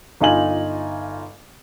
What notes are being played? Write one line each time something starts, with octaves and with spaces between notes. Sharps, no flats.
G1 D#4 F4 G#5 F#7